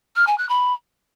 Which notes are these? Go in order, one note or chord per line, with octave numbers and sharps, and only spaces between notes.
F6
G#5
F#6
B5